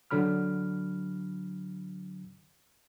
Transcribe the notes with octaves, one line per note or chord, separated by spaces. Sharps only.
D3 F#3 B5 F6